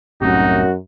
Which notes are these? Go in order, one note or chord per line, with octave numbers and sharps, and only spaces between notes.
C2 F#2 A2 C3 D#4 F#4